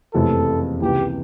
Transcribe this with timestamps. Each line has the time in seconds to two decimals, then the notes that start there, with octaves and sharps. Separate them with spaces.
0.14 F#1 F2 C3 E3 A3 A4
0.81 C#2 C3 E3 G4